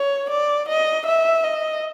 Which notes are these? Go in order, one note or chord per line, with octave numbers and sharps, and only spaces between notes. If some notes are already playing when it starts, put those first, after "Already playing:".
Already playing: C#5
D5
D#5
E5
D#5